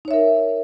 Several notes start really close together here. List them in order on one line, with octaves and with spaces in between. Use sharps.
D#4 C#5 E5 A#4